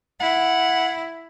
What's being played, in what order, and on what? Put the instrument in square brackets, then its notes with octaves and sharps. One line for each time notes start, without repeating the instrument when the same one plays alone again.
[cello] E4 [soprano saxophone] F#5